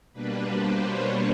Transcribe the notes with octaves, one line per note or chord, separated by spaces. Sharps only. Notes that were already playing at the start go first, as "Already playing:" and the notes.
B2 G3 A#3 D4 B4
C5
C#5